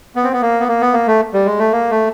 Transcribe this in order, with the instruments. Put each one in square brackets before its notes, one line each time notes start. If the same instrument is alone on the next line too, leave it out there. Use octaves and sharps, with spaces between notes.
[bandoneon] B3
C4
B3
A#3
B3
A#3
B3
A#3
A3
G3
G#3
A3
A#3
A3